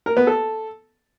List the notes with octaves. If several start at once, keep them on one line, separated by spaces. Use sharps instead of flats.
A#4
B3
A4